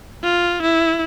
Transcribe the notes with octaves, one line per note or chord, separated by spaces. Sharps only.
F4
E4